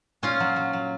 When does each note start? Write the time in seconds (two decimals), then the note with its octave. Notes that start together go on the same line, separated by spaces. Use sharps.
0.23 A#2 C#4 F4
0.40 F#3
0.56 F#3
0.73 F#3